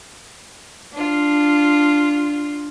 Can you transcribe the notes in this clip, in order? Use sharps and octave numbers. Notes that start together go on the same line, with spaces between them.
D4 F4